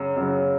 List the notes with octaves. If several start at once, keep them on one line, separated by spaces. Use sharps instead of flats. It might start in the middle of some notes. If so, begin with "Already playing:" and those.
Already playing: F#2 C#3
F#2 C#3 F#3